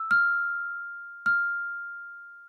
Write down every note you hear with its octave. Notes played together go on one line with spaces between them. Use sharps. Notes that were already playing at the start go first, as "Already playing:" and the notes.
Already playing: E6
F6
F6